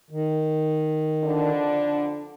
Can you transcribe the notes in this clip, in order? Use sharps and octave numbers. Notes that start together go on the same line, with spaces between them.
D#3
F2 D3 D4